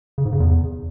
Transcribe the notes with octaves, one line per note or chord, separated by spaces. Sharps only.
C#3
G#2
C#3
E2